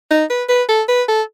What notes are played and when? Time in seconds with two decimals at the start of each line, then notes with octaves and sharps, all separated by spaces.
0.11 D#4
0.30 B4
0.49 B4
0.69 A4
0.89 B4
1.08 A4